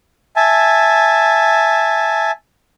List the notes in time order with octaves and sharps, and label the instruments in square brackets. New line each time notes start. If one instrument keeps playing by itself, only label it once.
[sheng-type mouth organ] E5 G#5 A5